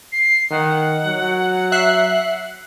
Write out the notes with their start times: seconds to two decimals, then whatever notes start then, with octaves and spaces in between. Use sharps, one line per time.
0.12 C7
0.51 D#3 F#5
1.06 F#3
1.72 E5 F#6 C7